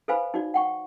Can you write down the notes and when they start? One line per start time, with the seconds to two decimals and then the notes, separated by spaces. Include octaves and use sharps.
0.08 A4 B4 C5 F5 G#5 B5
0.34 D#4 F#4 D5
0.54 F#5 G5 C#6